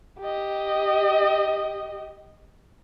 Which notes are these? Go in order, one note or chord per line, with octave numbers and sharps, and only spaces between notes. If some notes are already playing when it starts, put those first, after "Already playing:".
G4 D#5